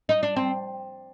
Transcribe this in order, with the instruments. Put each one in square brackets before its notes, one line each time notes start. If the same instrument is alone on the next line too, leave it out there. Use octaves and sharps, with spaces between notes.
[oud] D#4
D4
C4